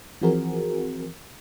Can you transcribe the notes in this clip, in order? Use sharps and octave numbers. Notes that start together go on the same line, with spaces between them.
E3 F3 C4 F#4 G#4 A#4